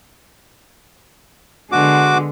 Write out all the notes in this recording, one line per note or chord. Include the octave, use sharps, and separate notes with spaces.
D3 G#3 B3 F#4 D6